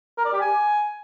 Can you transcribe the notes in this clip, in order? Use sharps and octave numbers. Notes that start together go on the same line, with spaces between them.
A#4
D5
G4
G#5